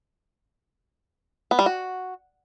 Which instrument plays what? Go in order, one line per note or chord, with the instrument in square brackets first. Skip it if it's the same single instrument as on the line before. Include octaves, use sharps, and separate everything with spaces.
[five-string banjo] B3
G3
F#4